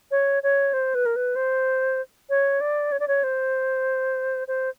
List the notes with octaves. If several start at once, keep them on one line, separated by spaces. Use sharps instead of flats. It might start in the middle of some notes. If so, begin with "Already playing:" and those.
C#5
C#5
C5
B4
A#4
B4
C5
C#5
D5
C#5
D5
C#5
C5
C5